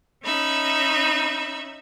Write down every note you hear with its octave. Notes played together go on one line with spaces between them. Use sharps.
C#4 D#4 E5 B5